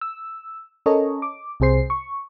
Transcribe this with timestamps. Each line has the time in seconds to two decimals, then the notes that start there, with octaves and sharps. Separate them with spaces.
0.01 E6
0.86 C#4 A4 A#4 C#5 D#5
1.22 D6
1.60 C2 C3 G#4 C5 C7
1.90 C#6